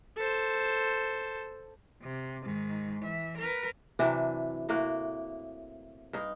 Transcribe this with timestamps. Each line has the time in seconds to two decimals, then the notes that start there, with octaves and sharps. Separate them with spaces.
0.17 A4 C5
2.03 C3
2.43 G#2 D#3
3.01 E3 E5
3.38 A#4 B4
3.99 C3 E3 F#3 D4
4.69 A2 C3 A#3 F#4
6.13 G2 D#4